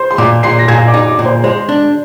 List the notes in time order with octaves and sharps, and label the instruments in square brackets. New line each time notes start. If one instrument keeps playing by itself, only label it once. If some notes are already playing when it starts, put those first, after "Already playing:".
Already playing: [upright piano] C5 C6
C6
[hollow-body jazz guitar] A#2 [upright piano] D5 D6
[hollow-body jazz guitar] A#2 [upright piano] C6 C7
[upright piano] A#6
[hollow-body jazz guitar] A#2 [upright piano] G#5 G#6
[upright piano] D5 D6
[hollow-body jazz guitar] D#4
[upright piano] D5 D6
[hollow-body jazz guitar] A#2
[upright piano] C5 C6
[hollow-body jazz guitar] G#3 [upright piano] C5 C6
[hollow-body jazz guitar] D4